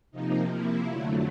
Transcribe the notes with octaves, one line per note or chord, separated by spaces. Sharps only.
C3 F3 A#3 D#4
E4
F2 D3 F#3 A3